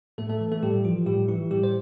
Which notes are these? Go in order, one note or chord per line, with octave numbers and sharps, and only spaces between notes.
A2 A3 A4
A3 A4
E3
A3 A4
A2 G3 G4
E3 F3 F4
A2 G3 G4
E3 E4
A2 G3 G4
C5